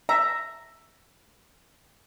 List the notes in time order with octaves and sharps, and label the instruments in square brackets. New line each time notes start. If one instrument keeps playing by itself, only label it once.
[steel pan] E5 [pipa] A#5